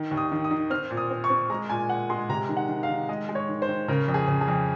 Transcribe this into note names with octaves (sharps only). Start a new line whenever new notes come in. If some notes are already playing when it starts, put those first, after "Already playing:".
Already playing: D#3
D#2
D#6
D#3
D#6
D#3
C4 F6
A#2
D#6
C4
C#6
C4
G#3 A#5
A#2 G#5
A#2 F#5
G#3 C6
C3 A#5
D#3
F#5
D#3
F5
D#3
G#3 D#5
G#3
C#5
D#3
C5
D#3
C#3 A#4
F2
G#4
C#3
G#4
F2